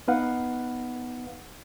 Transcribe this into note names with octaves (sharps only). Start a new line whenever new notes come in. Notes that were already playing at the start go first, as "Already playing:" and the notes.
B3 D#4 B4 F5 F#5